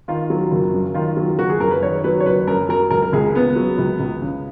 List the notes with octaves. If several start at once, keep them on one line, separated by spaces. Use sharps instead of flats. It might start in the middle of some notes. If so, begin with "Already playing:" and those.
D#3 F4
F#3
F#1
F#2
D#3 F4
F#3
F#1 F#4
G#4
F#2 A#4
B4
D#3 C#5
F#3 B4
C#5
F#1 B4
F#2 A#4
F#3 A#4
C#2 A#4
A#4
C#2 G#4
C#3 B3
F#3
C#2
C#2
C#3